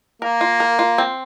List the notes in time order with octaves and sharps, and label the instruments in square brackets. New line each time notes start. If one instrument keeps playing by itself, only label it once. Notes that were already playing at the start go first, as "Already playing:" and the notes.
[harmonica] A#3 [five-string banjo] A#4
[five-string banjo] F4
A#4
F4
C4